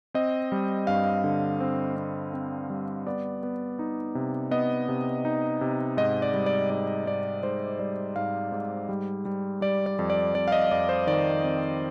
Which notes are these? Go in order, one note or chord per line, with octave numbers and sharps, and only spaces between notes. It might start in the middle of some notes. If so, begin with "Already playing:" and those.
C4 D#5
G3
G2 F5
D3
C4
C4
C4
G3
B3 D5
B3
D#4
C3
B3 D#5
C3
D#4
C3
G#2 D#5
D5
G3
D5
G#2 D5
G#2 D5
G#2 C5
G3 D5
G#2 F5
G#2
G3
G3
G3 D5
D5
F2
D5
F2 D5
F5
D#5
F2 D5
C5
D#3 D5
C4